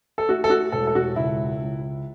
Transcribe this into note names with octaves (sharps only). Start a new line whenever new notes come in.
A4
A3 F#4
A4
F#4
E1 A4
A4
F#4
C#2 E4
C#2